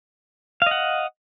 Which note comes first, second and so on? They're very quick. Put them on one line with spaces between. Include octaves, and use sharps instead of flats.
F5 D#5 F#5